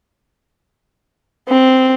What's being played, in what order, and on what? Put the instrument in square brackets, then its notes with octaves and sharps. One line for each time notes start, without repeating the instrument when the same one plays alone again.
[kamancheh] C4